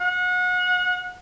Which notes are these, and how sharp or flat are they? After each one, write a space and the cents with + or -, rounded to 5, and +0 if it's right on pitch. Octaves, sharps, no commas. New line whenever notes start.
F#5 -30